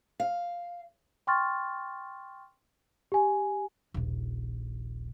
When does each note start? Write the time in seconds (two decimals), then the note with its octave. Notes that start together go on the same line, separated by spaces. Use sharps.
0.20 F5
1.27 G5 C6 C#6 F6 A6
3.12 G4 G#5
3.94 D#1 A#1